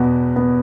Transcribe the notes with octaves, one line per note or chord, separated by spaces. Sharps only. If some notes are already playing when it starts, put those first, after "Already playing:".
Already playing: E2 B2 B3
B3